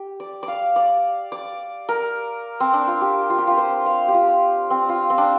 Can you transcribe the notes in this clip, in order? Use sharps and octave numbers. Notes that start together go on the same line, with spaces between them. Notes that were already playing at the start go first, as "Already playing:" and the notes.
Already playing: G4
D5
D5
F5
D5
D5
A#4
C4
D4
F4
G4
F4
G4
F4
C5
F5
G4
F4
C4
F4
C4
D4